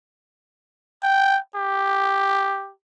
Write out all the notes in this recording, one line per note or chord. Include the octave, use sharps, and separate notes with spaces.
G5
G4